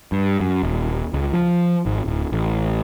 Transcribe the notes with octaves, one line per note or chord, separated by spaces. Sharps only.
G2
F#2
D#1
C#2
F3
G#1
D1
A1